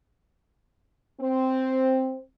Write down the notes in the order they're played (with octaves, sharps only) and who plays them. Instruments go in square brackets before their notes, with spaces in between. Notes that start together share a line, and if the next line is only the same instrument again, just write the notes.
[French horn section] C4